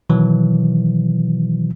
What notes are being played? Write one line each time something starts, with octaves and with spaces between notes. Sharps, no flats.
B2 D#3 E3 F#3